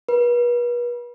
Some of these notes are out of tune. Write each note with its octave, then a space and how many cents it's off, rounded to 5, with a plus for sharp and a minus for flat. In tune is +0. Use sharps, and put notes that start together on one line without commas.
B4 -40